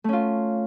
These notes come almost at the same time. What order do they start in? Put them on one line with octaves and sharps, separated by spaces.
A3 C#4 F4